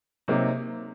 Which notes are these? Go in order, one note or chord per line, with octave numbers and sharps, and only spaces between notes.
C3 F#3 A#3 D#4